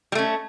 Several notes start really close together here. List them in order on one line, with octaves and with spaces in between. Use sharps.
G3 A3 C#4